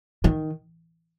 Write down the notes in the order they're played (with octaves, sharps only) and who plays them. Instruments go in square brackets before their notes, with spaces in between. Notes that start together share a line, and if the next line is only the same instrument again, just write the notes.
[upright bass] D#3